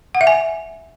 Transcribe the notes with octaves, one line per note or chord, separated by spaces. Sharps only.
F#5
E5
G#5